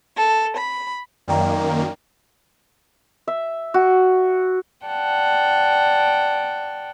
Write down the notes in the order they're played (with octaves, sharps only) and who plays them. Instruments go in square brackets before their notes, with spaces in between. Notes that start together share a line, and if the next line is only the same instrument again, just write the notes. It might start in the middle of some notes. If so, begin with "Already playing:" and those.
[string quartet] A4
B5
[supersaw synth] F#2 D#3 A#3 [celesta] D5 G5 A#5
[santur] E5
F#4
[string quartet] D5 F#5 G5 A5